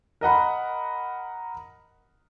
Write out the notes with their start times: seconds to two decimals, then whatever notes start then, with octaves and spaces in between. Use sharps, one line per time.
0.21 A#4 D#5 F#5 B5